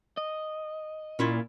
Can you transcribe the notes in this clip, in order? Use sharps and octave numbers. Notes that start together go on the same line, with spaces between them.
D#5
A#2 C#4 E4 F4